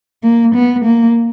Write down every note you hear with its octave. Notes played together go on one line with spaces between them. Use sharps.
A#3
B3
A#3